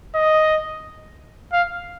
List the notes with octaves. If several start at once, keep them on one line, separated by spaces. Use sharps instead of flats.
D#5
F5